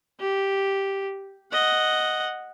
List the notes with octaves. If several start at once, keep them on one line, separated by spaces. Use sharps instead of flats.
G4
D#5 F#5